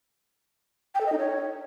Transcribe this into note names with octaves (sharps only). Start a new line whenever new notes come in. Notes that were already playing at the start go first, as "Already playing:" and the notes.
G5
A4
D#5
D#4
C#5